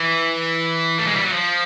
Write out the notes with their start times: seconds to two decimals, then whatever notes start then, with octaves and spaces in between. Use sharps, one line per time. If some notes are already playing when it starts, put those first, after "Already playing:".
Already playing: E3
0.99 A3
1.07 G#3
1.16 G3
1.24 F#3
1.33 F3